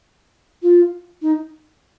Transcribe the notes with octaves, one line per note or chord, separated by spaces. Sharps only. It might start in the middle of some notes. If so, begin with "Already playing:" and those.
F4
D#4